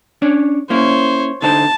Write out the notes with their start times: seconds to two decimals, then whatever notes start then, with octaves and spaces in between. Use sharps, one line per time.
0.22 C#4 D4 C#5
0.70 A#3 C#4 E4 C5 C#5
1.42 D3 D#4 C5 A5